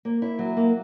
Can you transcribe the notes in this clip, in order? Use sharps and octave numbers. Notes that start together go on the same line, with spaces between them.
A#3
E4
F#3
A#3